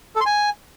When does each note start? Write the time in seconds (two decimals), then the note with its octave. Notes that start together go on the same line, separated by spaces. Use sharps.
0.16 A4
0.21 C6
0.26 G#5